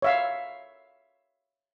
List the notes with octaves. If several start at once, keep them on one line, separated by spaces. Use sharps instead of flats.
C#5 E5 F5